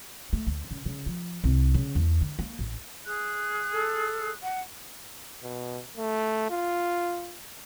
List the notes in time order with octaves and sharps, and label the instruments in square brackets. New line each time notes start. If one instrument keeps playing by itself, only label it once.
[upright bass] A3
D2
C#3
C#3
F3
C2
C#3
E2
D3
A#3
A1
[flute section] G#4 F#6
[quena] A4
F#5
[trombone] B2
A3
F4